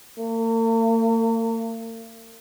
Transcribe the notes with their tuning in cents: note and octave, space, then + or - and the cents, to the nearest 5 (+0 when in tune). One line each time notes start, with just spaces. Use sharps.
A#3 -45